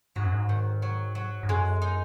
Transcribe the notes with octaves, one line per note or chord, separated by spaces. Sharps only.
G#2 F#3
F#2
G#2
D#3
F#3
F#3
G#2
F#2 G#3
D#4